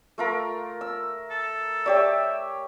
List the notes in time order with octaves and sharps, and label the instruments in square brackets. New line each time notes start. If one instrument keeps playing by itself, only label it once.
[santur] A3 F4 A#4
E6
[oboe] A4
[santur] G4 C#5 [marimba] D5 G5 [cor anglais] E5